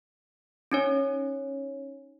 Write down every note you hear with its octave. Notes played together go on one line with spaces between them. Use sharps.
C#4 D#4 C#5